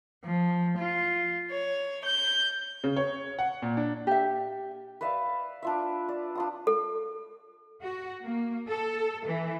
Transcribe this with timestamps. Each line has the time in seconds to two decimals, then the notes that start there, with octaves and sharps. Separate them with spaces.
0.25 F3
0.78 F4
1.53 C#5
2.07 G6
2.84 C#3
2.97 C#5
3.39 F#5
3.62 A#2
3.77 D4
4.07 G4 E5
5.01 B4 D5 E5 F5
5.62 D4 F4 E5
6.08 D5
6.35 D4 F4 D#6
6.67 A4
7.83 F#4
8.22 A#3
8.69 A4
9.26 E3